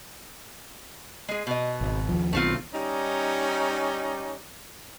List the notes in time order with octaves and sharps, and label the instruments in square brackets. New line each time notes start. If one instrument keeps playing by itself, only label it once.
[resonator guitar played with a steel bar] G#3 G#4
B2 D#5
[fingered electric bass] G#1
D#2 F3
[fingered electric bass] B1 B2 D#3 [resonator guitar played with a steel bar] A3 C4 F4
[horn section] G3 C#4 D#4